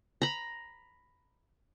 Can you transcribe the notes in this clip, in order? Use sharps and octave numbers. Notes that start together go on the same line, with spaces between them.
A#5 B5